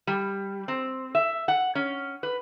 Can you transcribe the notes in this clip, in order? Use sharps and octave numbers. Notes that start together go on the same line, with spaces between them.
G3
C4
E5
F#5
C#4
B4